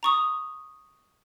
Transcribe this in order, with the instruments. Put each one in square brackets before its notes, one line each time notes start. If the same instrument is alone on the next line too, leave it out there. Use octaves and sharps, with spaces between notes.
[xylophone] A#5 C#6 D#6